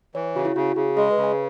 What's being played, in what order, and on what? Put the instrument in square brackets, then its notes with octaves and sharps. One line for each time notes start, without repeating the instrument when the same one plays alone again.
[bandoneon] E3 [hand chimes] C#5
[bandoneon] C#3 [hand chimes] F#4
[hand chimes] E4
[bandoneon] C#3 [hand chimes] F#4
[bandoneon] C#3 [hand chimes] G#4
[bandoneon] G#3 [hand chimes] G#4
[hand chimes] B4
[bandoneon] C#3
[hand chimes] G#5